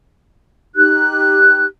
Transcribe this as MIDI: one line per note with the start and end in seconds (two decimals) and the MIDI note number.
0.75 1.64 63
0.75 1.64 67
0.75 1.64 90